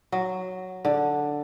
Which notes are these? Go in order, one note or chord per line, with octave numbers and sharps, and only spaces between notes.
F#3
D3